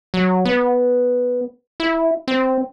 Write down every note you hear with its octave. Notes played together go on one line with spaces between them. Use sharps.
F#3
B3
E4
C4